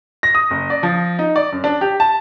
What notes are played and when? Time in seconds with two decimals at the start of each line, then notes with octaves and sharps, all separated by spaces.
0.23 A#6
0.35 D#6
0.51 F#1
0.70 D5
0.83 F3
1.19 D#4
1.36 D5
1.52 F#2
1.64 D4
1.81 G4
2.00 A5